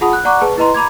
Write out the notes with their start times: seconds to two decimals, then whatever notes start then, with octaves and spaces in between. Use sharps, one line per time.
0.01 F4 G#4 F#5 A5 B5 D#6
0.13 F#6
0.25 D5 F#5 A#5 C#6 D6 F#6
0.41 G#4 B4 A5
0.58 E4 B4 D#5 A#5 C6
0.74 A#5 B5 D6 G#6